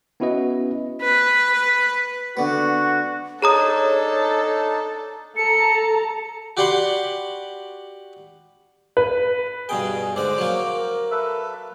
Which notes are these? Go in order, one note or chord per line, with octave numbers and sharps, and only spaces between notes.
B3 C#4 E4 F#4 B4 D#5
B4
D3 B3 F#4
D4 D#4 G#4 A4 C#5 A#5 D#6
A4 A5 A#5 C#7
F#4 G4 D5 F#5 B5 C6
B4
G2 B2 G#4 G5 G#5
G#2 D3 C5 F#5 D6
F#3 A#3
A#4
A4 B4 E5